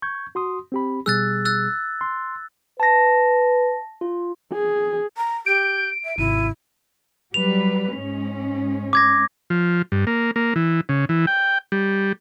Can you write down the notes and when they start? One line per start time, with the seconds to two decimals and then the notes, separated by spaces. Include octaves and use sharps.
0.02 C#6 G6 G#6
0.35 F#4 C6 D#6
0.72 C4 G4 B5
1.06 B2 G3 G#4 E6 F#6 A6
1.45 E6 F#6 A6
2.01 C6
2.80 B4 A5 A#6
4.01 F4
4.53 G#4
5.17 A#5
5.46 G4 G6 D7
6.05 E5
6.18 G#1 C3 E4 D#7
7.34 F#3 G3 B4 F7
7.95 G#2 G#3 C#4
8.93 D6 G#6 A#6
9.50 F3
9.92 G2
10.07 A#3
10.36 A#3
10.56 E3
10.89 C#3
11.09 E3
11.27 G5
11.72 G3